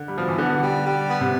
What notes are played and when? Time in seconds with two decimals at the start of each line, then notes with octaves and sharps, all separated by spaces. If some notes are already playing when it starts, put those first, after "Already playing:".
Already playing: D3
0.08 G3
0.16 B2 F3
0.28 E3
0.38 D3 B3
0.62 G3
0.85 G3
1.09 B3
1.21 C3